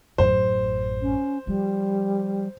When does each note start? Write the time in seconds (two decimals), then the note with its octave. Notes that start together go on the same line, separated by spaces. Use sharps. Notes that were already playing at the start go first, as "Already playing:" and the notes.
0.18 A1 F#2 C5
1.02 C#4
1.47 F3 G3